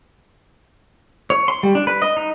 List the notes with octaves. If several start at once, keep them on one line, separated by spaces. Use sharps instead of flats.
C#5
C6
G3
D4
B4
D#5
D#4